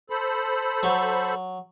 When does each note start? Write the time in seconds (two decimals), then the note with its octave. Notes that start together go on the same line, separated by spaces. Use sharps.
0.10 A4 C5 B5
0.83 F#3